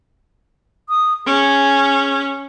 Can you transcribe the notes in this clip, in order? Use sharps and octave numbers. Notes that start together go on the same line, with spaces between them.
D#6
C#4 G#4